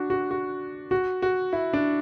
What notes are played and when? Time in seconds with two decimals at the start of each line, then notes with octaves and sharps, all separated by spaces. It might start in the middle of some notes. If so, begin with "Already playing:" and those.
Already playing: D4 F#4
0.10 F#4
0.31 F#4
0.91 F#4
1.22 F#4
1.53 E4
1.73 D4